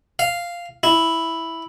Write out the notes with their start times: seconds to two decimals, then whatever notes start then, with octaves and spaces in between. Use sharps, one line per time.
0.19 F5
0.83 E4